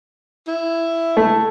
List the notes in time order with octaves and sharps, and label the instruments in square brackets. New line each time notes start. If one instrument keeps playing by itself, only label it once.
[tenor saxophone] E4
[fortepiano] A3